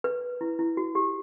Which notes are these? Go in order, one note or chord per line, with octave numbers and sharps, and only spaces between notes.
B4
E4
E4
F#4
G4